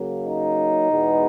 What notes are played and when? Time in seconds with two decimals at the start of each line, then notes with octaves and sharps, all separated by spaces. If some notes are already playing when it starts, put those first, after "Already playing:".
Already playing: C#3 F#3 A#3
0.24 D#4
0.90 E2 B2 G#3 B3